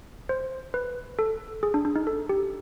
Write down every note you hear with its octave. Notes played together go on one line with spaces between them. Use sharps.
C5
B4
A4
G#4
D4
D4
D#4
A4
G4